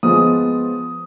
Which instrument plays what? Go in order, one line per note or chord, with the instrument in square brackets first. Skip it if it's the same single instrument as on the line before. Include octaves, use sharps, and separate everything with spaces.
[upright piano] F3 G#3 B3 F4 D#6